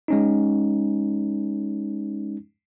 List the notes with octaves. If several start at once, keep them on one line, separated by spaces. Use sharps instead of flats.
G#3 C#4 D#4